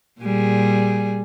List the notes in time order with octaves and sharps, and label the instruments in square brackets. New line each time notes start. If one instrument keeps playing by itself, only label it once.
[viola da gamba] A#2 G3 G#4